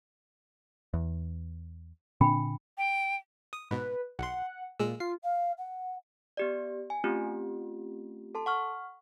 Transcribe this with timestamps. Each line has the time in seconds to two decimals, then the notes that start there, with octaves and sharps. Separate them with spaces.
0.94 E2
2.21 A#2 D3 C4 D4 G5 B5
2.78 G5
3.53 D#6
3.71 G#2 B2 B4
4.19 B1 F#5 C6
4.79 A#2 G#3 G#4 E6
5.00 F4 C7
5.23 F5
5.57 F#5
6.37 B3 G4 D5
6.90 G#5
7.04 A3 C4 C#4 F4 G4
8.35 A4 A5 C6
8.46 F#5 C#6 F6